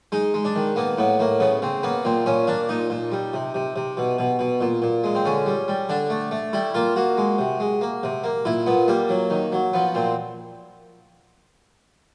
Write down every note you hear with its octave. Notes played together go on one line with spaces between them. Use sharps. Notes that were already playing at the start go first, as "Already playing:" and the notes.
G#3 D#4
G#3
D4
D#3
A#3 B3
A2 B3
A2 A#3
C#3 B3
C#3 C4
A#3 B3
A#2 C4
A#2 C#4
A#3 D4
A#2 D#4
A#2
G3
C3
C3
C3
B2
B2
B2
A#2
A#2
G#3
C4
D3 C#4
G3
G3
D3 D4
A3
A3
G3 E4
A#3 F4
A#3 F#4
G#3
C3
G#3
A#3
C3
A#3
A#2 E4
A#2 B3
G3 A#3
F#3
D#3
F#3
F3 B3
A#2 C4